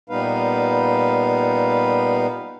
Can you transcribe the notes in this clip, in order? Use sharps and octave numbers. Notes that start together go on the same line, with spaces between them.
A#2 G3 B3 D#4 B4 F5